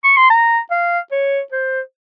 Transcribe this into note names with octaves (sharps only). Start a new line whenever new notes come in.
C#6
C6
A#5
F5
C#5
C5